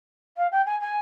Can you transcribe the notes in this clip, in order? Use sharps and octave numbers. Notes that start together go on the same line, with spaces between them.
F5
G5
G#5
G#5